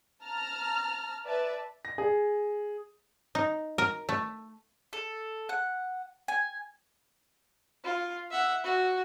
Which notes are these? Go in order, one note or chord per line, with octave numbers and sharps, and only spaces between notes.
A5 A#5 F6
B4 D5 E5 A5
A#6
G#4
D#4
A#4
A3
A4
F#5
G#5
F4
E5 F#5
F#4